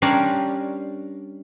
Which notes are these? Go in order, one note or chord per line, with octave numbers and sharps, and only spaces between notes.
G3 C#4 D4 A#4 C5 D5